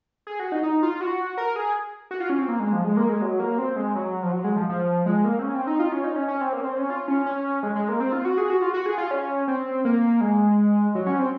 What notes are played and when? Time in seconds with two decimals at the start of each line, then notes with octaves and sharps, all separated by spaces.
0.27 G#4
0.40 F#4
0.52 D#4
0.63 D#4
0.83 F4
1.01 F#4
1.38 A#4
1.56 G#4
2.11 F#4
2.20 F4
2.30 C#4
2.39 C4
2.49 A#3
2.60 G#3
2.73 F3
2.84 G#3
2.97 A#3
3.09 G#3
3.22 F#3
3.40 A#3
3.58 C4
3.76 G#3
3.95 F#3
4.23 F3
4.32 F#3
4.44 G#3
4.57 F3
4.69 F3
5.06 G#3
5.24 A#3
5.39 C4
5.43 C#4
5.55 C4
5.67 D#4
5.79 F4
5.92 C#4
6.04 D#4
6.16 C#4
6.28 C#4
6.41 C4
6.53 A#3
6.61 C#4
6.65 C4
6.78 C#4
6.90 F4
7.08 C#4
7.26 C#4
7.63 G#3
7.76 G#3
7.88 A#3
8.00 C4
8.13 F4
8.25 F#4
8.38 G#4
8.50 F#4
8.62 F4
8.74 F#4
8.86 G#4
8.98 F4
9.11 C#4
9.48 C4
9.85 A#3
10.21 G#3
10.95 F#3
11.07 C#4
11.19 C4